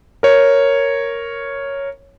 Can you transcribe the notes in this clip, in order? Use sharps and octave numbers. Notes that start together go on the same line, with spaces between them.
A#4 C#5